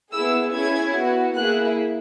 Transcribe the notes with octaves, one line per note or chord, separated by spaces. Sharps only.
B3 E4 G#4 E6
C#4 E4 G#4 G#6
B3 F#4
A#3 E4 G#4 F#6